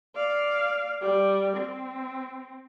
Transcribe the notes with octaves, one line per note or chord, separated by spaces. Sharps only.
D5 F5
G3 D5
C4